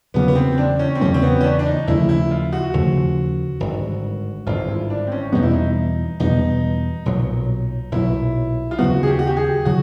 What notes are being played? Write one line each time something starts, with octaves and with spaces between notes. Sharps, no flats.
E2 C#3 F#3 A#3 B3
B3
C4
D4
C#4
C4
E2 C#3 F#3 A#3 C#4
C4
B3
C#4
D4
D4
D#4
D#2 C#3 F3 A3 E4
E4
F4
F#4
D#2 C#3 F3 A3
G#1 G2 D3
G#1 G2 D3 F4
E4
D4
C4
C#4
E2 B2 G3 B3 D#4
E4
D#4
E2 B2 G3 B3 D#4
B1 A#2 F#3
B1 A#2 F#3 E4
F4
D#2 C#3 F#3 B3 F#4
G#4
G4
F#4
G4
G#4
C#3 F#3 F#4